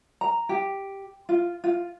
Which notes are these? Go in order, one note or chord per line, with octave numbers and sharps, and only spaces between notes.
A#5
G4
F4
F4